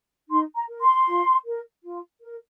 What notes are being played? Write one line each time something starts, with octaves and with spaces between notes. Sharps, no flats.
D#4 C6
A#5
A#4
C6
F4
A#4
F4
A#4